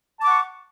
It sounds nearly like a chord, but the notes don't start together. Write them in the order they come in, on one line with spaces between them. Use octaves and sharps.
A5 D6 F#5 C#6